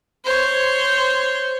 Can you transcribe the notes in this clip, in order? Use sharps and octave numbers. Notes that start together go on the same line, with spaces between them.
C5 C#5